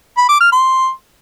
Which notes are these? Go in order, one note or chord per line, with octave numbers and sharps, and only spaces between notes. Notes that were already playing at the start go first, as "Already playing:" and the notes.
B5
D6
F6
C6